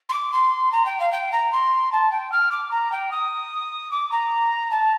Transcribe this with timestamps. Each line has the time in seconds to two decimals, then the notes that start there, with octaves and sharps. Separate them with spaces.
0.09 C6
0.13 D6
0.32 C6
0.72 A#5
0.85 G5
1.00 F5
1.12 G5
1.32 A#5
1.52 C6
1.92 A5
2.11 G5
2.32 F6
2.51 D6
2.71 A#5
2.92 G5
3.11 D#6
3.91 D6
4.11 A#5
4.71 A5